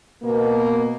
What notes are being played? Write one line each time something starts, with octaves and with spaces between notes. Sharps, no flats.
B2 A#3